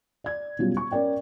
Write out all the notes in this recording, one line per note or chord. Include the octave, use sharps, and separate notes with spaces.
D5 G#6
B2 F#3 G3 C#4 F4 F#4
C#6
C#4 A#4 D5 G5